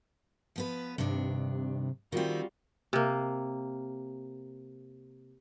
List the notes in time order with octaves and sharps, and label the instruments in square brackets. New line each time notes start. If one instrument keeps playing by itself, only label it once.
[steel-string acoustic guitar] F3 B3 B4
[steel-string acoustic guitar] G2 D#3 D4 [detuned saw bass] C3
[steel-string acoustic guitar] D#3 C4 [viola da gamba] G3 F4 F#4
[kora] C3 A#3